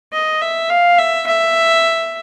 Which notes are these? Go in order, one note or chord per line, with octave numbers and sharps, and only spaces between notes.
D#5
E5
F5
E5
E5